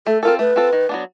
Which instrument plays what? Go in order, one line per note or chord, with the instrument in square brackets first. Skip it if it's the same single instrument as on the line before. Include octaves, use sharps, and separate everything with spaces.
[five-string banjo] A3 [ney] A4
[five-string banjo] C4 F4 A4 [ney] A#4
[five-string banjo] A3 [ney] B4
[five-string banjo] C4 F4 A4
D#3
F#3 B3 D4